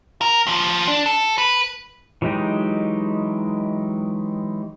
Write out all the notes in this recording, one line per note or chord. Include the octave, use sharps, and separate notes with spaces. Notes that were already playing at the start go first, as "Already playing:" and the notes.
A#4
D#2 F3
D4
A4
B4
E3 F#3 G#3 D#4 G4